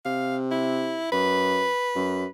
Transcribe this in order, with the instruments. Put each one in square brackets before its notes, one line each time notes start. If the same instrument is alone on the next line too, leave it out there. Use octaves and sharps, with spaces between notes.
[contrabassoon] C3 [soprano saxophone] F5
[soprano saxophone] E4
[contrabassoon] F#2 [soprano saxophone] B4
[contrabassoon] F#2